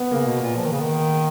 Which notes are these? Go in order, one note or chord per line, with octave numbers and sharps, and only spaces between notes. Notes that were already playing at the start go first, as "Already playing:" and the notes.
Already playing: B3
C#3 A#3
B2
A#2
F3
D#3
C#3
D#3